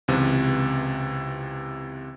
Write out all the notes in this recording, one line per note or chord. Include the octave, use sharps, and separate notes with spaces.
C#2 C3 E3